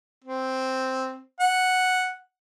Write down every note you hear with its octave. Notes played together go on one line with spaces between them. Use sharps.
C4
F#5